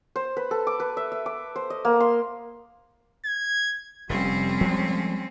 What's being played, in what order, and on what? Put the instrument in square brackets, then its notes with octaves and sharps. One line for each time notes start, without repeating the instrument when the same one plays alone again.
[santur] C5
B4
A4
D6
B4
E5
E5
D6
C5
D#5
A#3
C6
[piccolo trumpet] G#6
[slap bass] F1 [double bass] G3 [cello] C4 C#4
[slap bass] F3 G#3 A3